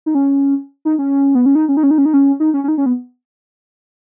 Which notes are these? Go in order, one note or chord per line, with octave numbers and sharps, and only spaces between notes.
D#4
C#4
D#4
C#4
B3
C#4
D#4
C#4
D#4
C#4
D#4
C#4
D#4
C#4
D#4
C#4
C#4
D#4
C#4
B3